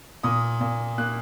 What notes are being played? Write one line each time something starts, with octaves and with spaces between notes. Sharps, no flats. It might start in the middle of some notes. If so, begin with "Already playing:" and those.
A#2 D#6
A#2
A#3 F#6